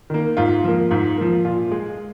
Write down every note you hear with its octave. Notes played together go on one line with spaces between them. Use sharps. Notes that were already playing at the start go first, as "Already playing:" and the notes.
D#3 A#3
G#2 F4
F3 A#3
G#2 F4
F3 A#3
A#2 F4
G#3